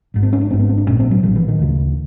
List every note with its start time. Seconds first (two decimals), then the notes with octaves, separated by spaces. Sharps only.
0.14 G#1 G#2
0.23 C4
0.33 C#4
0.41 D4
0.50 G#1 G#2 C4
0.59 B3
0.69 C4
0.78 D4
0.87 A#1 A2 C#4
1.00 C4
1.11 F#3
1.23 A#1 A2 F3
1.36 E3
1.48 D#3
1.59 D2 C#3